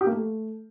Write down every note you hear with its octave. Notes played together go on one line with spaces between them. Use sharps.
G4
A#3
A3